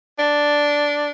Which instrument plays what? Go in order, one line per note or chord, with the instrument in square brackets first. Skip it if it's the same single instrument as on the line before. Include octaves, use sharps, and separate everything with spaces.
[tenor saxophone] D4